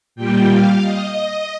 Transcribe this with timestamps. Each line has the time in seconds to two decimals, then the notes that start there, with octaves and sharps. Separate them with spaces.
0.16 A#2 G3 G5
0.49 F5
0.81 D#5